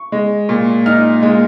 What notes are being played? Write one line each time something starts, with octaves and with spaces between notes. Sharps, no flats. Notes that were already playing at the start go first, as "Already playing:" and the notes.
Already playing: C#6
G#3
A#2
D#4 F6
G#3